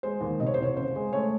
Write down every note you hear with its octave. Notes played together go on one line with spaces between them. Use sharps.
G#3 C5
D#2
C3 D#5
C#5
C5
C2 C#5
C#3 C5
G#3
A3 C#5